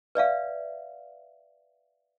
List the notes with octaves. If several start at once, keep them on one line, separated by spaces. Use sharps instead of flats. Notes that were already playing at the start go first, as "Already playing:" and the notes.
B4 D5 E5 F5